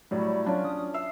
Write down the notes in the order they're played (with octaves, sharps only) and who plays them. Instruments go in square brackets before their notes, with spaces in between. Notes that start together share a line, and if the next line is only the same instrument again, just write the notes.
[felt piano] A2 F#3 G3 [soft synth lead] D5
[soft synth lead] F#3 [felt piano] C#4 D4 F4
[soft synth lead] D#6
[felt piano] E5 E6 [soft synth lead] C7